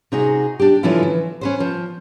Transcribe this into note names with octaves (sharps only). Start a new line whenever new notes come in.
C3 D#4 F#4 G#4
D4 G4
D3 E3 F3 C#4 E4 F4
E3
C#4 B4 C5
F3